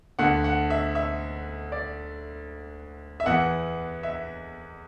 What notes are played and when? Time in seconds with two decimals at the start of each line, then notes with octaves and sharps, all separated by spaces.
0.19 D2 D3 F#5
0.44 F#5
0.70 E5
0.95 E5
1.72 D5
3.20 E5
3.26 E2 E3 F#5
4.03 E5